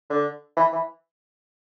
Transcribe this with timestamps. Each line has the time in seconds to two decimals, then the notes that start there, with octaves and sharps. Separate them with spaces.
0.10 D3
0.56 E3
0.72 E3